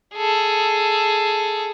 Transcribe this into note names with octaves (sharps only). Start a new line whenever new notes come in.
G#4 A4